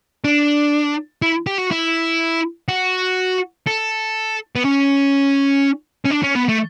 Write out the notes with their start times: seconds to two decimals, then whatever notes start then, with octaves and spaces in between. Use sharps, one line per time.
0.24 D4
1.22 E4
1.47 G4
1.58 F#4
1.71 E4
2.69 F#4
3.67 A4
4.56 B3
4.65 C#4
6.05 C#4
6.11 D4
6.24 C#4
6.36 B3
6.49 A3